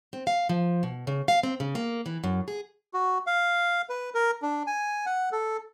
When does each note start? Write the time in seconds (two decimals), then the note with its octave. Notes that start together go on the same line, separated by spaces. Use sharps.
0.13 C4
0.27 F5
0.49 F3
0.83 B2
1.07 C#3
1.28 F5
1.43 C4
1.60 C#3
1.75 A#3
2.06 E3
2.24 F#2
2.48 G#4
2.94 F#4
3.27 F5
3.90 B4
4.15 A#4
4.42 D4
4.67 G#5
5.06 F#5
5.32 A4